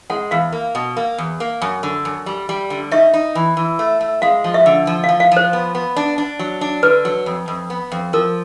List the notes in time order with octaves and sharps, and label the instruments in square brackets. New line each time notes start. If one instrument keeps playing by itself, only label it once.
[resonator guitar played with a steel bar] G#3 [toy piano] F#5
[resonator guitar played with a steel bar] E2 [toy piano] F5
[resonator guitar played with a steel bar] A#3
B2
A#3
E2
A#3
F#2
D3
F#2
G3
G3
D3
[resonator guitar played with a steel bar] D#4 [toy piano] E5
[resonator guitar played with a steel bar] D#4
E3
E3
A3
A3
[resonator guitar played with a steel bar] G#3 [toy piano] F5
[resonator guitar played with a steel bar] F3
[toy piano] E5
[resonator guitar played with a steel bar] D3
F3
[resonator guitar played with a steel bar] F3 [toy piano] F5
[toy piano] F5
[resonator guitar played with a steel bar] F3 [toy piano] C5
[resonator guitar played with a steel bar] B3
B3
D4
D4
F#3
D4
[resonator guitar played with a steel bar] D3 [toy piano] B4
[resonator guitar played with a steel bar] F#3
F2
F2
B3
F2
[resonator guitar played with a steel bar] F3 [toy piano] A#4